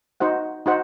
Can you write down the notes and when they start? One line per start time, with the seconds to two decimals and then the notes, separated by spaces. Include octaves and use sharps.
0.20 D#4 F#4 C5 F#5
0.66 D#4 F#4 C5 F#5